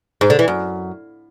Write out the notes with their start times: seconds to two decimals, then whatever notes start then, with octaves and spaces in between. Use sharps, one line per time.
0.21 G#2
0.30 D3
0.39 E3
0.48 F#2